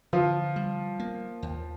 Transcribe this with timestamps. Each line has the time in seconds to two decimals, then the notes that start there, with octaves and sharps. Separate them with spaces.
0.13 D3 F3 F4
0.56 G3
1.00 A#3
1.42 D#2